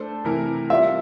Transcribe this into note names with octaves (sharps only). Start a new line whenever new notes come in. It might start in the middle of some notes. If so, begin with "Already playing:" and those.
Already playing: A3 D4 A4 C5
C3 E3 A3 E4 A#4
G3 C4 F4 E5